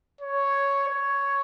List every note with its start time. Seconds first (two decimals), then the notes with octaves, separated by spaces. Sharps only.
0.21 C#5
0.88 C#5